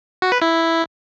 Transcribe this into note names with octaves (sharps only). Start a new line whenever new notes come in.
F#4
B4
E4